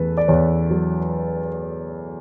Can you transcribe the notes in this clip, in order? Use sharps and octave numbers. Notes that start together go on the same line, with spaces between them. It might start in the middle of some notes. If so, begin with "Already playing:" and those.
Already playing: E2 A3 A4 B4
D5
E2 C#5
F#3